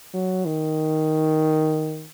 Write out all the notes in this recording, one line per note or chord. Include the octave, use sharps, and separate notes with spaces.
F#3
D#3